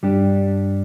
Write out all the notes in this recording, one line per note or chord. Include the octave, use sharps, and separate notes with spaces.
G2 G3 D4 G4